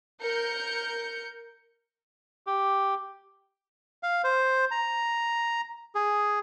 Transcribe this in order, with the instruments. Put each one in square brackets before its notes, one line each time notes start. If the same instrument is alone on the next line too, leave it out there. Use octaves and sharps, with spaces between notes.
[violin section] A#4 G6 C#7
[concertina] G4
F5
C5
A#5
G#4